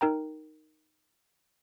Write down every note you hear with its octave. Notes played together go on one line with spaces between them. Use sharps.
D#4 A#4 G5 A#5